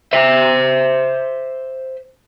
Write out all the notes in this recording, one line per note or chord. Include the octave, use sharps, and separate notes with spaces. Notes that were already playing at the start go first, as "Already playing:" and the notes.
C5 E5